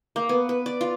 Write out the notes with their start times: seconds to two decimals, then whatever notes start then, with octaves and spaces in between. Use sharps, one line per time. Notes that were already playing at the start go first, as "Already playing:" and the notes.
0.16 A#3
0.29 B3
0.49 B4
0.66 D5
0.81 F4